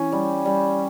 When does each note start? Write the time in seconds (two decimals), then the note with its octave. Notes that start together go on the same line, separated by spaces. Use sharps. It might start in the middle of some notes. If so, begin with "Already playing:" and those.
Already playing: E3 C#4
0.12 G3
0.45 G3